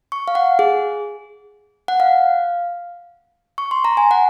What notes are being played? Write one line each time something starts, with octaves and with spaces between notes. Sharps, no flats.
C#6
F5
F#5
G#4
F#5
F5
C#6
C6
A#5
G#5
F#5